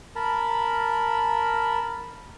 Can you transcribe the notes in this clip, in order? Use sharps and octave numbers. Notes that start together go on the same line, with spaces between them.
A#4 A5 B5